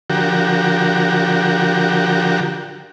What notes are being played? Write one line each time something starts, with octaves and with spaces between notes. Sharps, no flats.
D3 F3 F#4 G4 A#4